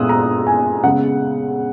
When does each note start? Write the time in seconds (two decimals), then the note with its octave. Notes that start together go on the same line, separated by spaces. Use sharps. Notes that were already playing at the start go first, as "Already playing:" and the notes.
Already playing: A#2 G#3 B3 D#6 E6 F#6
0.09 A#5
0.47 G#5
0.84 C#3 G#3 B3 F#5